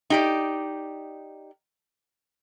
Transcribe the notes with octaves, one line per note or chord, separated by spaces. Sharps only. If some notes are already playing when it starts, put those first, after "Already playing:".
D#4 G4 D5